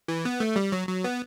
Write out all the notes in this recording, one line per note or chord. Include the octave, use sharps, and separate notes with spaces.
E3
B3
A3
G3
F#3
F#3
B3